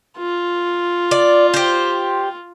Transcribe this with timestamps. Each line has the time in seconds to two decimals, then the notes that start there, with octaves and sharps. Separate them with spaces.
0.18 F4
1.11 D5
1.54 G4 C5